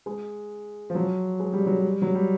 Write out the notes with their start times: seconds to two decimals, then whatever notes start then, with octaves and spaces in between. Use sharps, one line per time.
0.06 G#3
0.90 F3
0.95 F#3
1.40 G#3
1.53 G3
1.66 F#3
1.79 G3
2.02 F#3
2.15 G3